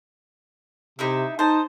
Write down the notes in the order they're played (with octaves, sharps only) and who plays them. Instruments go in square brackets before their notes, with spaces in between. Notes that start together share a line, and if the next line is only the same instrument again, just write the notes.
[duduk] C3 [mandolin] D#4 E4 E5
[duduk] D#4 [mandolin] C5 A5